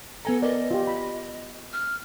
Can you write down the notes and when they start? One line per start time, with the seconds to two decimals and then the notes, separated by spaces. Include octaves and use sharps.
0.25 B3 A4 G#5 A#5
0.42 A#4 D5 D#5
0.71 F4 G4
0.87 B5
1.73 F6